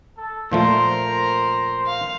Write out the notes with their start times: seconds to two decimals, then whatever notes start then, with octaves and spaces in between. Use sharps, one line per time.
0.17 A4
0.52 A#2 F3 A3 A#4 C5
1.07 C5
1.87 F5